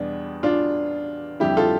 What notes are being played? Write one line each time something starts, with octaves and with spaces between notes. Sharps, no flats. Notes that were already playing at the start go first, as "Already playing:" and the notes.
Already playing: E2 B2 G3 D4
D4 F4
F2 D3 G3 E4 G4
F4 A4